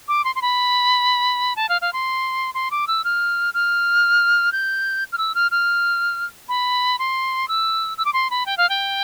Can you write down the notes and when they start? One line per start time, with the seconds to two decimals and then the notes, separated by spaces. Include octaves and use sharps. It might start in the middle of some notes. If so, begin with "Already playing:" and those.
0.08 D6
0.25 C6
0.35 C6
0.42 B5
1.56 A5
1.69 F5
1.81 F5
1.93 C6
2.54 C6
2.71 D6
2.88 E6
3.04 F6
3.54 F6
4.52 G6
5.12 F6
5.18 E6
5.35 F6
5.51 F6
6.49 B5
6.99 C6
7.48 E6
7.98 E6
8.05 D6
8.13 C6
8.30 B5
8.46 G5
8.57 F5
8.69 G5